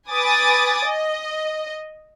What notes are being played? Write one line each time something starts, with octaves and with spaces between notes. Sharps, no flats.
B4 G#5 D6 D#6 A6
D#5